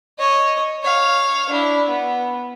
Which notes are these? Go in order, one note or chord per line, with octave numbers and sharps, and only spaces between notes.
C#5 D#5
C#5 F5
D4 E4
B3